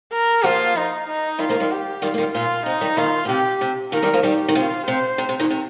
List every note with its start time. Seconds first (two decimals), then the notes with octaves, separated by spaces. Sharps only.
0.13 A#4
0.44 F3 A#3 F4
0.76 D#4
1.07 D#4
1.39 D#3 G3 F4
1.49 F3 A#3
1.60 D#3 G3
1.71 G4
2.02 D#3 G3 F4
2.14 A#3
2.18 D#3 G3
2.34 A#2 F4
2.66 C3 D#4
2.81 D#3 G3
2.97 A#2 D#3 F4
3.25 A#2
3.29 C3 G4
3.61 C3
3.92 A#2 D#3 A#4
4.03 D#3 G3
4.14 F3 A#3
4.23 D#3 G3 G4
4.48 D#3
4.55 C3 F3 F4
4.87 C3 C5
5.18 C3
5.29 C3
5.39 A#2 D#3
5.50 C3